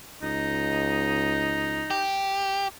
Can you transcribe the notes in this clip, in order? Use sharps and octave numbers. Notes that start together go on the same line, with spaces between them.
C#2 D#4
G4